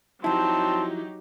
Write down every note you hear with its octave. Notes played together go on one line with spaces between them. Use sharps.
F3 F#3 C4 D#4 E4 G4 A5